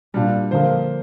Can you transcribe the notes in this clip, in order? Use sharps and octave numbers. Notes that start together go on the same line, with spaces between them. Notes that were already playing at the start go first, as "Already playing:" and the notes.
A#2 G3 D4 F4
D3 F3 A#3 F4 C5